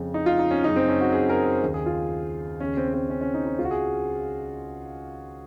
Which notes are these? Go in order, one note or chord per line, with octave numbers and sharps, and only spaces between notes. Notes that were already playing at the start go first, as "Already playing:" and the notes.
Already playing: F2 C#3
D#4
F4
D#4
C#4
F#2 C#3 D#4
C4
C#4
F#4
G#4
A#4
C5
D#2 C#3
G#4
F4
D#2 C#3 C#4
C4
C#4
C4
C#4
C#4
D#4
D#4
C#2 C#3 F4
F#4
G#4